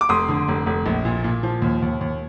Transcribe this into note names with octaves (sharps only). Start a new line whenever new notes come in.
D6
F1 C6 D#6
D3
F1
F1
A#1
A#2
A#2
F3
D#2
D#2
D#2